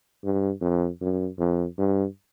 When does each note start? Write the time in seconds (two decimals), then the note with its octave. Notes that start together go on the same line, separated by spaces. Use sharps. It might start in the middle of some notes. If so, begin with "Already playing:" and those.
0.24 G2
0.62 F2
1.01 F#2
1.39 F2
1.78 G2